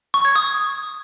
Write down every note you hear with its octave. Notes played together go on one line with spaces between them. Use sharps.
C#6
G#6
D#6